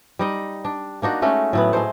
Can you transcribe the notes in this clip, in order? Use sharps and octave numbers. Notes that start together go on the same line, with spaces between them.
G3 D#4 D#5
D4
A#3 D4 D#4 F#4
G#3 A3 C#4
A2 F#3 B3
G#3 A3 C5